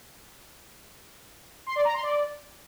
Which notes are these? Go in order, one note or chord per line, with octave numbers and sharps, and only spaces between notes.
C6
D5
A#5
C6
D5